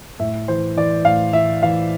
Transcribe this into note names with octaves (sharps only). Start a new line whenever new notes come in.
A2 E5
E3 C5
E3 D5
A2 F5
E3 E5
E3 F5